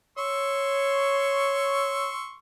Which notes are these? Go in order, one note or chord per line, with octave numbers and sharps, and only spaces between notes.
C#5 C6 C#6 E6